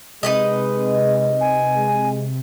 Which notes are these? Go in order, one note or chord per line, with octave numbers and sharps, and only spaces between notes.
C3 G#3 D#4 B4 D#5
G#5
G#3